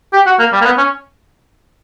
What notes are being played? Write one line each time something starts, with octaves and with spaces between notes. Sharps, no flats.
G4
F#4
A#3
G3
A#3
B3
C#4